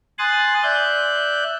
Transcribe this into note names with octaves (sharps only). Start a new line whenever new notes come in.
G#5 C6 D#6 F#6 A6
D5 E5 F#6 G6